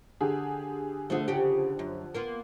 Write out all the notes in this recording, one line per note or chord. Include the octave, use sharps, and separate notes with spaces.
D3 G4 G#4
D3 F3 A3 G#4
C#3 G4
F#2
A#3 B3 F4